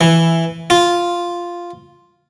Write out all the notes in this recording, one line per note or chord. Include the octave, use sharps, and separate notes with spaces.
E3
F4